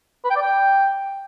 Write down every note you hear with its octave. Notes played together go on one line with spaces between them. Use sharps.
B4
G5
D5
G5